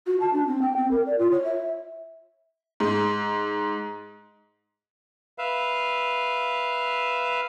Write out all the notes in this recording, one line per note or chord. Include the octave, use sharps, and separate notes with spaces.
F#4
A5
D4
C4
G5
C4
A#4
D5
F4
C#5
E5
G#2
B4 E5 F5